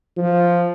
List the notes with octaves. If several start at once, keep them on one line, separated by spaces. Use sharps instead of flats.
F3